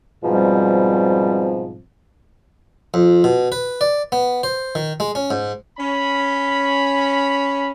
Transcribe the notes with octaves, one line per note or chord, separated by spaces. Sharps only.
G#2 B2 F3 G3 C4
F2
B2
B4
D5
B3
C5
D#3
G#3
C#4
G#2
C#4 B5